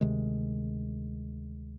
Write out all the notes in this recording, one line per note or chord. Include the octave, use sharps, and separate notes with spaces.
D2 C3 D#3 G#3